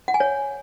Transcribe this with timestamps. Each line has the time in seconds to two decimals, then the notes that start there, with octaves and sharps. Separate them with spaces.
0.08 F#5
0.14 G#5
0.20 C#5